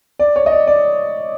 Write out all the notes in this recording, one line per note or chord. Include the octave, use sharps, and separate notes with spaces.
D5
C#5
D#5
D5
D5